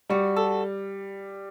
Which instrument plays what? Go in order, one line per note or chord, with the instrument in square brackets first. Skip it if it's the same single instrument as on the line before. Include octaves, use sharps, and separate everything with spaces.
[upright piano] G3 [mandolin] F#4
[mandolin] A4